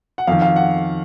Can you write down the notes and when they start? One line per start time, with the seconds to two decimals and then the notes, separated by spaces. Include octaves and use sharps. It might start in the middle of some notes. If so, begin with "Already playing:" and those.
0.18 F#5
0.27 F2 D#3 F5
0.42 F5
0.56 F#5